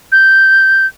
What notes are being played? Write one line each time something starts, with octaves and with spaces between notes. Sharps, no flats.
G6